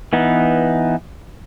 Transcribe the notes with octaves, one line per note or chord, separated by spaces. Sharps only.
E3 B3 D#4